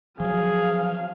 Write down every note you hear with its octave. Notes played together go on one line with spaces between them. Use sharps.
F3 F#3 G#4 F5